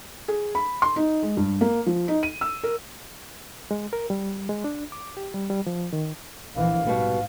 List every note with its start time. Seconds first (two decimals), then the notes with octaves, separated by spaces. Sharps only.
0.28 G#4
0.55 B5
0.82 C6
0.96 D#4
1.23 G#3
1.37 G2
1.61 A#3
1.86 F3
2.08 D#4
2.23 D#7
2.41 E6
2.63 A#4
3.71 G#3
3.93 A#4
4.10 G3
4.49 G#3
4.64 D4
4.92 D6
5.17 G4
5.34 G3
5.50 G3
5.67 F3
5.93 D#3
6.56 A#1 E3 F5
6.86 G#2 B2 G3 B3